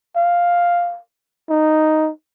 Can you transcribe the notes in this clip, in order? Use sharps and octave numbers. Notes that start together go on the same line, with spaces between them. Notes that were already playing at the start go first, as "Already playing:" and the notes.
F5
D#4